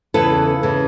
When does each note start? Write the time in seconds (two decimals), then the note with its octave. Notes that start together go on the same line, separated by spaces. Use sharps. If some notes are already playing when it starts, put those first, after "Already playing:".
0.14 E2 C#3 E3 A4 B4
0.63 C#3 E3